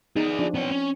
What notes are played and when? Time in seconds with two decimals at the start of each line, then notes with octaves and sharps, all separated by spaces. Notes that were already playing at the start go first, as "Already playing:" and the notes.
0.16 D#4 G#4 D5
0.39 F3 D4
0.54 B3 C4 C#5
0.71 C#4